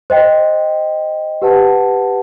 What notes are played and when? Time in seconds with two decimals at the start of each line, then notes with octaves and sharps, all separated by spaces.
0.10 C5 D#5 G5
1.42 G4 B4 F#5 A5